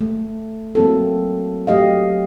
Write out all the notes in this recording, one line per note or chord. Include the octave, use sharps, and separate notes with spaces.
A3
F#3 A#3 C4 E4 A4
F#3 A3 G4 D#5 F5